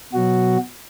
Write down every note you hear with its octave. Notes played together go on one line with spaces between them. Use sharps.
B2 F#3 F#4